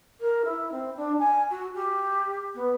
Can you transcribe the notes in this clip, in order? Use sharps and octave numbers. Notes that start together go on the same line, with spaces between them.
A#4
E4
C4
D4
G#5
F#4
G4
B3